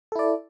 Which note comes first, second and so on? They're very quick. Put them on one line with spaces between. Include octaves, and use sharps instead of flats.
A4 E4 D5